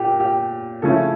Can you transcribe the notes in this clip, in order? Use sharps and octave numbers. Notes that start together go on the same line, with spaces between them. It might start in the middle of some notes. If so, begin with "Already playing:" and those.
Already playing: A#2 G4
G4
C#3 F3 A3 C#4 E4 A4